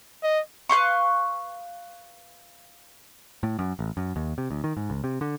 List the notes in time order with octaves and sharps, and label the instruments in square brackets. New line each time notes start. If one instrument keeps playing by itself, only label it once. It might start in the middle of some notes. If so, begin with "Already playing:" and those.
[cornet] D#5
[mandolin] B4 F5 C6 C#6
[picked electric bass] A2
F#2
A1
F#2
D#2
C3
D2
D#3
G#2
C#2
C3
D3